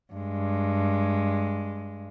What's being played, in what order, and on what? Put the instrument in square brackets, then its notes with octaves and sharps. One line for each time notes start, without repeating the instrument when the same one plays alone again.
[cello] G2 G#3